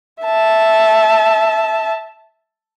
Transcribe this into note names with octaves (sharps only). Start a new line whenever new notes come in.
E5 A5